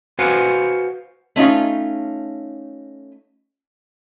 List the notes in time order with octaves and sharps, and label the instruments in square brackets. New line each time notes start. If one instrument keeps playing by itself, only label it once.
[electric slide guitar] F#4 B4 C5 F5 F#5 G#5
[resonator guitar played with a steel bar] A3 C#4 D#4 F4